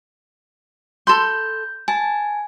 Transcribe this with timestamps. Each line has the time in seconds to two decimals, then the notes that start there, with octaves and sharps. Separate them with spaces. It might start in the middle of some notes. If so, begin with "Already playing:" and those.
1.07 A4 B5 C6 G6
1.88 G#5 A5